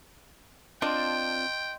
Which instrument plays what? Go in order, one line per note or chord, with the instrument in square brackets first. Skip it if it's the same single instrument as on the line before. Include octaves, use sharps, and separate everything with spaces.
[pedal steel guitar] C4 F4 A5 [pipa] D4 [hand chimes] D#5 C6 [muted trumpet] G5